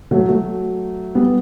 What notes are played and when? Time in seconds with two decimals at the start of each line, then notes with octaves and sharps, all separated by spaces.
0.11 F#3 A3
0.29 F#3 A3
1.15 G3 B3